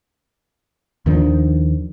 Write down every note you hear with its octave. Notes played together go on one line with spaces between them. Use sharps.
D#2 D#3 F3 D4